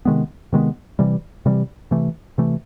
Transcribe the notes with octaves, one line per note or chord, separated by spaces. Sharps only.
C3 D#3 G#3 B3
C3 D#3 G#3 B3
C3 E3 G3
C3 E3 G3
C3 E3 A3
C3 E3 A3